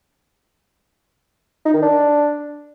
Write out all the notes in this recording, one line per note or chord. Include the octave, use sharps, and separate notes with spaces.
D#4
D#3
D4